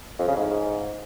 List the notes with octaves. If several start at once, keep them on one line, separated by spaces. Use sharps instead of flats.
F2
C#3
G#2